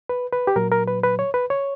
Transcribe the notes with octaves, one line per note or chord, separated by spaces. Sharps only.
B4
B4
G4
A#2 F#3 A#4
A#4
B4
B4
C#5
B4
C#5